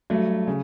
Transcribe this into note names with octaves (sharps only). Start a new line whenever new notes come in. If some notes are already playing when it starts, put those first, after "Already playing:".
G2 F#3 A3
C#3